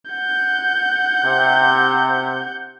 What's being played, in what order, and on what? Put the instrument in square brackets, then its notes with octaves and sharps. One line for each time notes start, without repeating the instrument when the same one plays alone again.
[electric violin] F#5 G6
[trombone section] C3